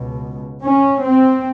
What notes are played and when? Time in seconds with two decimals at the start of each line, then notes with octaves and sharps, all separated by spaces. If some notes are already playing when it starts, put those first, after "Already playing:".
Already playing: C#2 B2
0.63 C#4
1.04 C4